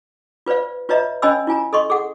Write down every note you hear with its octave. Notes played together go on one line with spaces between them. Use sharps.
F4 B4 C5 D5 F5
F4 B4 C#5 D#5 E5 A#5
C#4 C#5 D#5 G#5 B5 E6
E4 F4 G#5 A#5
A4 D#5 C6 C#6
G#4 A4 F#5